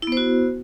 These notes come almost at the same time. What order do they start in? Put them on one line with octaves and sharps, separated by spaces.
E4 B3 C5 F#4